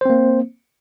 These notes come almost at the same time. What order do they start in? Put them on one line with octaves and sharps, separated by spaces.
C5 C4 A#3